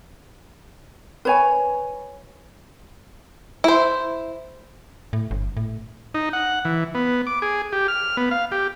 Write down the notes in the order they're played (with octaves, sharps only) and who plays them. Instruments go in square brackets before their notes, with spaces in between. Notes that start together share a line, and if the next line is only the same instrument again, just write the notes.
[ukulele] B4 C#5 G#5
[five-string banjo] E4 C5
[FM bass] A2
G1
A2
[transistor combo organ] D#4
F#5
E3
B3
D6
G#4
G4
F6
B3
F5
G4